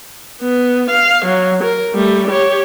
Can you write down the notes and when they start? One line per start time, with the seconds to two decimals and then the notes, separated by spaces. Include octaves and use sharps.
0.41 B3
0.90 F5
1.25 F#3
1.64 A#4
1.94 G3 A3
2.30 G4 C#5